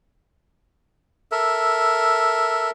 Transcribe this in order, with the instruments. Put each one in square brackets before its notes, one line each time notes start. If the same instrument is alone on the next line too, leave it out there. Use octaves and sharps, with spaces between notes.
[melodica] A4 A#4 E5